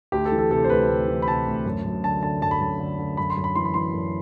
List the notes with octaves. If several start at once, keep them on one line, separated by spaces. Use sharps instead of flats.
D2 G4
A4
E3
A4
C3 A4
C5
D2 B4
D2
E3
B5
C3 A5
D2
F#2
F#2
D3 A5
D3 A5
F#2 A5
B5
F#2 A5
D3
D3
F#2 B5
C6
F#2
B5
E3 C6
B5
E3 C6
F#2